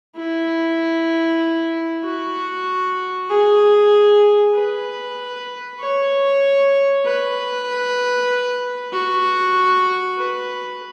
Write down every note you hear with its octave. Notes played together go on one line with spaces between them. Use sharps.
E4
F#4
G#4
B4
C#5
B4
F#4
B4